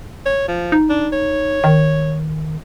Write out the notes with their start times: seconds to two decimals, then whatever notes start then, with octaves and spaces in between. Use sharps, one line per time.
0.26 C#5
0.48 F3
0.72 D#4
0.89 D4
1.13 C#5
1.64 D#3